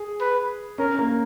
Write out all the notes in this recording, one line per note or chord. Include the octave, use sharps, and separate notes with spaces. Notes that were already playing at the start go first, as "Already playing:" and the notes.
Already playing: G#4
B4
C#4 A#4
A#3